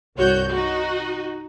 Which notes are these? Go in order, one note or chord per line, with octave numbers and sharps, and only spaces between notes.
C2 G2 F#4 C#5 G6
D#4 F#4